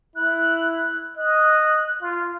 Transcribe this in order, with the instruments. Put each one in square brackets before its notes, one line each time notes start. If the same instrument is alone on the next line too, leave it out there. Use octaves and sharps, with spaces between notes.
[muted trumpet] E4 [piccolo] F#6
[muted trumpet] D#5 [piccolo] F#6
[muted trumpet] F4